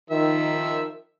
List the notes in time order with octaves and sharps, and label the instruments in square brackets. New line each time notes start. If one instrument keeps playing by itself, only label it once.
[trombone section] D#3 [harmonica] F3 E5